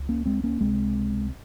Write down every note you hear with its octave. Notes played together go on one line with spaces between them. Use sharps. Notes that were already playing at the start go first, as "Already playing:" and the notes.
Already playing: C#2
A#3 C#4
G#3 C4
A#3 C#4
C#2 C3 G#3 C4